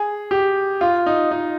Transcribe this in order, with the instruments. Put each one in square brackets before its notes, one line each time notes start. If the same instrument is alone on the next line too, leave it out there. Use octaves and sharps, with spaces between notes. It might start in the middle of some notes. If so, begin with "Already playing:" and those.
Already playing: [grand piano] G#4
G4
F4
D#4
D#4